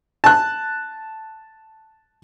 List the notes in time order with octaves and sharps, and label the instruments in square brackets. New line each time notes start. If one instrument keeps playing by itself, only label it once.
[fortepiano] A5 F#6